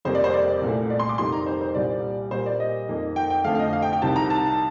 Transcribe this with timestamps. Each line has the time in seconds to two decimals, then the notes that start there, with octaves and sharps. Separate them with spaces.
0.05 F2 C3 G3 A#3 C5
0.15 D5
0.24 C5
0.34 D5
0.61 C2 A#2 A3
0.90 D5
1.00 C6
1.09 D6
1.18 F2 C3 D#3 G3 A#3 C6
1.33 A#5
1.46 C5
1.61 C5
1.75 C2 A#2 G3 D5
2.31 A#2 G3 A#3 C5
2.46 D5
2.60 D#5
2.88 F2 D#3 A#3
3.16 G5
3.30 G5
3.44 F2 D3 F3 A3 F5
3.55 F5
3.59 D#5
3.73 F5
3.82 G5
3.93 G5
4.02 C2 C3 D#3 A5
4.16 A#5
4.30 A5